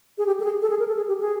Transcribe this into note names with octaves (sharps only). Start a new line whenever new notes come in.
G#4
G4
A4
G#4
A4
G#4
A#4
A4
G#4
G4
G#4